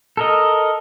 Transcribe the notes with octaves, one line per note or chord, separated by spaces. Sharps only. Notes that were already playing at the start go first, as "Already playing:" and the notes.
A4 A#4 D#5